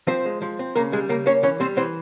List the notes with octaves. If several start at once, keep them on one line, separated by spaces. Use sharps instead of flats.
F3 C4 C5
G#3
F3
C4
C#3 A#3 A#4
G3 G#3 G#4
C#3 A#3 A#4
A#3 C#4 C#5
E3 C#4 C#5
G3 C4 C5
E3 C4 C5